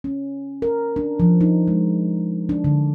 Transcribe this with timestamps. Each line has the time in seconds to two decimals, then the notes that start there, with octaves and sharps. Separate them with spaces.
0.04 C#4
0.62 A#4
0.96 D4
1.20 F3
1.41 D#4
1.68 G#3
2.49 D4
2.64 D3